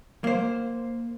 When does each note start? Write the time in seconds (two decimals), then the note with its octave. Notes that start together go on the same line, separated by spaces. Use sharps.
0.24 A#3 C5